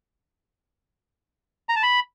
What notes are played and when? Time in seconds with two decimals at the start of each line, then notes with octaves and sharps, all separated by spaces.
1.69 A#5
1.76 A5
1.83 B5